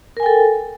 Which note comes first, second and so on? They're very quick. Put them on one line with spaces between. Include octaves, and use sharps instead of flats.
A#4 G#5 G5 A4